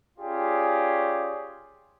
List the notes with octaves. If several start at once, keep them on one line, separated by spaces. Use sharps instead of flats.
C#4 F4 G4 G#4 D5